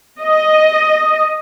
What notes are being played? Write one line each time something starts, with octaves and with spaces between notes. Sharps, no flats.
D#5